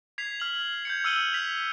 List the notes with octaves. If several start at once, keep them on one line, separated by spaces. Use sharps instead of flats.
G#6 B6 C7 F7
F6 F#7
G6 G#6 C#7
E6 F6 C#7 D#7 F#7 G7
B6 F7